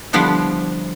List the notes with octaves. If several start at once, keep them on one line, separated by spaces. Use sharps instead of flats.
D3 F3 G3 B3 D4 E4